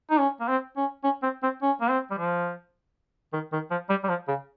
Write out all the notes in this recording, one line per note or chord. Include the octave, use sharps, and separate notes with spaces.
D#4
C#4
A#3
C4
C#4
C#4
C4
C4
C#4
A#3
C4
G3
F3
D#3
D#3
F3
G3
G3
F3
C#3